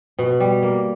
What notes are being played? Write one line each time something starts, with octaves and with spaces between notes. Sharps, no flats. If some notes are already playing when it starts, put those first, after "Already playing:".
B2
G3
A#3